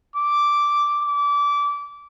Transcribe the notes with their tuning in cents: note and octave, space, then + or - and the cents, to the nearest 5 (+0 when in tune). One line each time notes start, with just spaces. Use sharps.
D6 -5
D6 -25